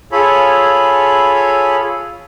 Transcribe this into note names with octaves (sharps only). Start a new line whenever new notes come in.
F4 G#4 A4 C#5 B5